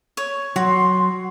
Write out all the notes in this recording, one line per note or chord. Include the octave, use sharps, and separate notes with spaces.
C#5
F#3 F#4 C6